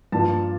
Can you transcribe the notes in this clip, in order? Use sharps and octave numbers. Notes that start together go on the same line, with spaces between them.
G2 F3 A#3 A5